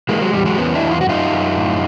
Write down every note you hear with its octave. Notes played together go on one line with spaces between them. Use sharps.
E3 G#3 A#3
F#3 G#3
E2 G3
F#3 G#3
E2 B3 C#4
D4 E4
E2
F4
F#4
F#2 D#4 F4
F#2
A2